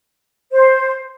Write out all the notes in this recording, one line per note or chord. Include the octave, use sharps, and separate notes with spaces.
C5